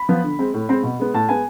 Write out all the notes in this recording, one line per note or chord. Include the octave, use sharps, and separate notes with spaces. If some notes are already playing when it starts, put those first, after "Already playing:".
Already playing: B5
F3 B3
D3
G#3 C4
A2
G#3 C4
B2
G#3 B3
A2 A5
G#3 B3 G#5